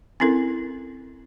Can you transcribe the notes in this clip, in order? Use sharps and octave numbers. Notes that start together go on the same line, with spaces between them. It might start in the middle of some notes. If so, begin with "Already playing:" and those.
C4 C#4 E4 A4 A#4